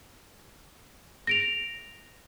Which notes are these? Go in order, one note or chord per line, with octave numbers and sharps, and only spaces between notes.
A#6 D7 F7